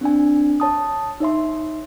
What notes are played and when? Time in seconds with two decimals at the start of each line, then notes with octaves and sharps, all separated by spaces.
0.01 C4 D4 G#5
0.60 C#5 A5 D#6
1.20 D#4 C#5 E5 C6